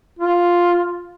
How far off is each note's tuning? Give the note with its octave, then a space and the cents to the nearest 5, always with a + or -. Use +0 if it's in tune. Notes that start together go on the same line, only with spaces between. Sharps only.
F4 +5